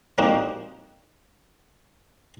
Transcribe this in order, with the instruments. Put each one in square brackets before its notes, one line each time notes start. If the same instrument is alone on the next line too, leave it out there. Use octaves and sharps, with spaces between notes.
[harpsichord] A#3 C4 D4 D#4 F#4 G4